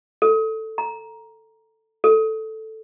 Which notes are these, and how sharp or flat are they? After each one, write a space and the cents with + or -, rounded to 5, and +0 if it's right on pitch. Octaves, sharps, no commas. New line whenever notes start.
A4 +5
A#5 +10
A4 +0